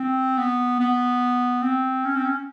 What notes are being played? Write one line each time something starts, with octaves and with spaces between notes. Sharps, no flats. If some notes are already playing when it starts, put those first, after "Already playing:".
Already playing: C4
B3
B3
C4
C#4
C4
C#4